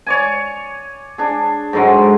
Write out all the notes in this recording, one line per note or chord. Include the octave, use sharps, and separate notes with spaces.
C#5 D5 G#5
D4 G#4
G#2 D3 F#3 G#3